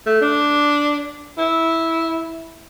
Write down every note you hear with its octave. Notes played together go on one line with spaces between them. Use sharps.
A3
D4
E4